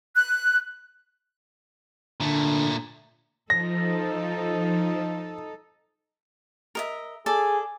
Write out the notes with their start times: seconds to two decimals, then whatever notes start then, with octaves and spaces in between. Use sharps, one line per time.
0.15 F#6
2.20 A#2 D3 A3
3.50 F3 D#4 A4 A#6
6.75 A#4 D#5 E5
7.26 G#4 A4 D5